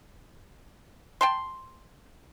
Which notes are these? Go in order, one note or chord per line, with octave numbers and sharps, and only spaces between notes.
G5 A5 C6